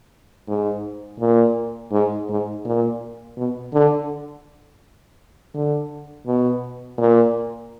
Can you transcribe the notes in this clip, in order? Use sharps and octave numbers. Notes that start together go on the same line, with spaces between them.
G#2
A#2
G#2
G#2
A#2
B2
D3
D3
B2
A#2